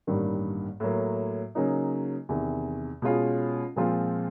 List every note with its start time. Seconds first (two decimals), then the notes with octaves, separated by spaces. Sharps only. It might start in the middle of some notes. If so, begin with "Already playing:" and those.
0.07 A1 G2 D#3 G3 A#3
0.80 A2 F#3 A#3
1.55 C#3 F#3 A#3 D#4
2.29 E2 C3 D#3
3.02 B2 G#3 C#4 F4 G#4
3.76 A#2 F3 G#3 C4 F4